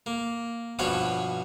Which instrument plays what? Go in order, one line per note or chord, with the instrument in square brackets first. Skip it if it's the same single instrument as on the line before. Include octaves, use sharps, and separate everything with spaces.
[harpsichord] A#3
G2 B2 F3 C#4 F#4 C#5